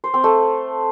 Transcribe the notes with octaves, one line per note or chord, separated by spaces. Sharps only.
C5
C4
A3